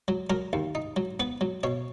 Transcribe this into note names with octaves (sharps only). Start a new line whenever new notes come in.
F#3
F#3 A#4
D#2
D#4
F#3
B3 B4
F#3
B2 C#5